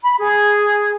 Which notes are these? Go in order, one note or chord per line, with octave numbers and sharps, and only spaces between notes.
B5
G#4